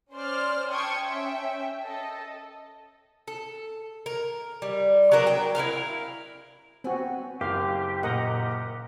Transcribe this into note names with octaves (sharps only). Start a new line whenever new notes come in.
C#4 C5 D5 C6 F6
G5 A5 C6 C#6 D#6 G#6
C#4 E5 G5
A4 D#5
A4
A#4
G3
F#3 B3 D4 A#4
G5
E4 F#4 A#4 F5
B3 C4 F#4 G#5
F#1 G4 F5
A#2 A#4 D#5 F#5